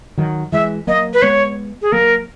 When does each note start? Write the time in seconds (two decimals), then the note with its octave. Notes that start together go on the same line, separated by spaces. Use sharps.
0.18 D#3 F#3
0.52 E3 G#3 E5
0.87 F#3 A#3 D#5
1.14 B4
1.22 G#3 B3 C#5
1.82 G#4
1.92 F#3 A#3 A#4